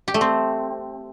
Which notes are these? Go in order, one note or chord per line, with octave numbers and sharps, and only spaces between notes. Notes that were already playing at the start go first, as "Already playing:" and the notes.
G4
A3
C4